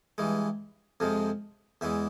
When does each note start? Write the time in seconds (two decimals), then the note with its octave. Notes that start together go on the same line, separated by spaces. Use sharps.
0.18 G2 E3 G#3
1.00 F2 C3 F3 G#3
1.81 E2 E3 G#3 E5